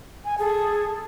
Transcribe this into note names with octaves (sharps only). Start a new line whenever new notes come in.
G#5
G#4 A4